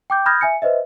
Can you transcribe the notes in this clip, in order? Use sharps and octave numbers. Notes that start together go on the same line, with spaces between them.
G5 D6 G6
B5 D#6 F6 G6 G#6 A#6
E5 G#5 C#7
B4 C5 D#5 E5